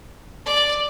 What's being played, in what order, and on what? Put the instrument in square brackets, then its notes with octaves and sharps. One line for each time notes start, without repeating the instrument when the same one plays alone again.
[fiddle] D5